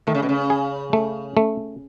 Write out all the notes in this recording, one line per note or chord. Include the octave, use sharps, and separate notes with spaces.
D#3 A3
C#3
B2
C#3
G#4
A3
A3